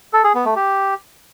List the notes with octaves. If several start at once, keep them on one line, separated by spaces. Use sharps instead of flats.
A4
G#4
B3
A3
G4